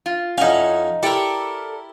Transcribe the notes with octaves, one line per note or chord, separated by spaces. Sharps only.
F4
F2 C#4 D#4 E4 F5 F#5 G#5
E4 G4 A4 A#4 D5 G5